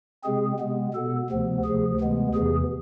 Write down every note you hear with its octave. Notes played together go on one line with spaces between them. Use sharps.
C3 G#3 C4 G#4
C3 G#3 B3
B2 B3 A4
D2 C3 F3 B3
D2 C3 F3 G#4
D2 C3 E3 G#3 B3
E2 C3 E3 G#4